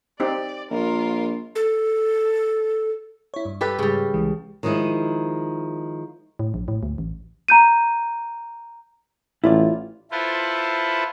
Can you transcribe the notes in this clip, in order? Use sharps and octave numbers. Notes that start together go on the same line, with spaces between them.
C4 D#4 G4 D5
A#1 F4 A#4
A4
E4 C#5
G2
G4 A4 B4
G#2 C#3 G3
C2 E3 G#3
D#3 F3 G#3 D#4 E4
A2
A#1
A2
D2
A1
A#5 G6 D#7
A1 E4 F4 D5
E4 F4 A4 B4 C5